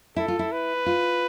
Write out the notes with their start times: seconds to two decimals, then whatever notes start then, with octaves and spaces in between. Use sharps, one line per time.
0.16 E4 A4
0.28 F4
0.39 E4
0.52 B4
0.86 F4